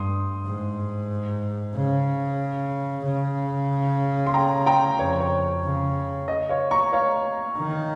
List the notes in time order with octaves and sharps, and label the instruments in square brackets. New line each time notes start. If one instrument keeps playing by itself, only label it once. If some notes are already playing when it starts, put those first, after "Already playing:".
Already playing: [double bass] G2 [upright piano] C6 D#6
[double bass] G#2
C#3
C#3
[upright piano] C6
G5 A#5
G5 A#5
[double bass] F2 [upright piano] C#5
[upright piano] C#5
[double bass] C#3
[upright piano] D#5
C#5 F5
A#5 C#6
C#5 F5
[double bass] D#3